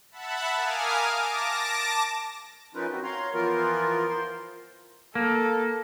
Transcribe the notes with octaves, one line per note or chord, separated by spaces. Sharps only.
E5 F#5 A5 B5
A#4 F5 G#5 D6 D#6 F6
A5 D6 A#6
F3 C#4 D#4 F4 A#4 B4
C4 F#4
C#5 F5 A#5 C6
E3 F3 B3 F4 A#4
C5 C6
A#3 A4